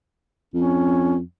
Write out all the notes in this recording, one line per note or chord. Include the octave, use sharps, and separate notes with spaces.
F2 C#4